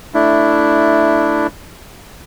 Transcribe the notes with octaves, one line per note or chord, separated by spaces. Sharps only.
A3 D4 E4